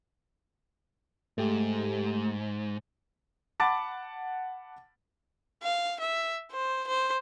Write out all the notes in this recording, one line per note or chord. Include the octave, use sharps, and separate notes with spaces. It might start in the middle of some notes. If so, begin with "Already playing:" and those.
G#2 A3 G4
F#5 A5 B5 D6 A6
F5
E5
C5
C5